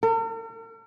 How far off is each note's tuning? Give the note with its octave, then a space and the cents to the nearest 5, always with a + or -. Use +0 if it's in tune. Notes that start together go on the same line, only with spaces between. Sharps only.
A#4 -45